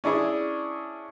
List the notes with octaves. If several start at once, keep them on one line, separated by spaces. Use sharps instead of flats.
C#4 D4 E4 G#4